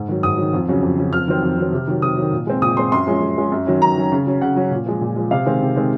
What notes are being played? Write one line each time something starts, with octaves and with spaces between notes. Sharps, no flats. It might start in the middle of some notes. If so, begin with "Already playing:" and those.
Already playing: G#2
D#3 F#3
G#2 D#6
D#3 F#3
F2
C#3 F#3 C#4
F2
C#3 F#3 C#4
F2 F6
D#3 F#3 C4
F2
D#3 F#3 C4
C3
D#3 F#3
C3 D#6
F#3
D#3
A#2
G#3 C4
A#2 D#6
G#3 C4 C6
F#2 C6
F3 G#3 C#4
F#2
F3 G#3 C#4
F#2
D#3 F#3 C#4
F#2 A#5
D#3 F#3 C#4
C#3
F#3 C#4
C#3 F#5
F#3 C#4
A#2
F3 G#3
A#2
F3 G#3
C3 F5
D#3 G#3 C4
C3
D#3 G#3 C4